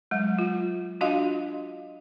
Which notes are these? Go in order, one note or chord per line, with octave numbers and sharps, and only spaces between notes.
F#3 G#3
F4
D4 F4 F#4 D#5 F5